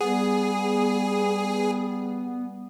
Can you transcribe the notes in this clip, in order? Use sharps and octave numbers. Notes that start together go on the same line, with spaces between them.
G3 B3 G#4